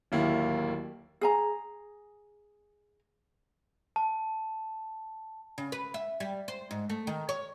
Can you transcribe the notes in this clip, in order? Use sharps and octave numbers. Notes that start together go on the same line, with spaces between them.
D1 D#2 A#3 E4
G#4 G#5 A#5
A5
C#3
B4
E5
G3
C5
G#2
A3
D#3
C#5